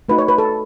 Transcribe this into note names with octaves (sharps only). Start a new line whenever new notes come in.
A3 D#4 F#4 B4
C#5
B4
A4